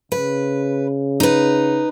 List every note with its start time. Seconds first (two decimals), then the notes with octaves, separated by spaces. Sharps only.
0.12 C#3 B4
1.20 D#4 B4